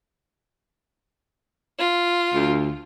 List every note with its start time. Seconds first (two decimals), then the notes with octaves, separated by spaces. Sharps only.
1.79 F4
2.34 D2